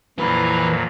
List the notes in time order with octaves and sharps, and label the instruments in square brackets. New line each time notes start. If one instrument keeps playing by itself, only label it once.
[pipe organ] F2 A#2 F#3 [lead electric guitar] E3 B4